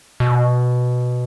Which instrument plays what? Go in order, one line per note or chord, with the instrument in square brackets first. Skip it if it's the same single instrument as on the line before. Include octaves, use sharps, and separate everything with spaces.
[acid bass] B2